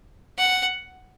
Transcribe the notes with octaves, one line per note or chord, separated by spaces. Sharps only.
F#5